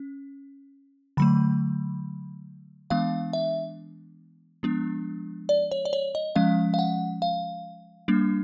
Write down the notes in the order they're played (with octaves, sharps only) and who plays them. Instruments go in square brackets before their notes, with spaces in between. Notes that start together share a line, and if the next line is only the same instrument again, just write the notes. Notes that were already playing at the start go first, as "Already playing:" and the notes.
Already playing: [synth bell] C#4
D3 F#3 A3 B5
E3 G#3 B3 D4 F5
E5
F3 G#3 B3 D4
D5
C#5
D5
C#5
D#5
F3 G#3 C#4 F5
F5
F#5
F5
G3 A#3 D4